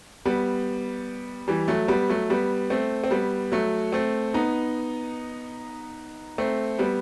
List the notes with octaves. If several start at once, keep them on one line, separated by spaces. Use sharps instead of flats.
G3 B3
E3 G3
F#3 A3
G3 B3
F#3 A3
G3 B3
A3 C4
C4
G3 B3
F#3 A3
A3 C4
B3 D#4
A3 C4
G3 B3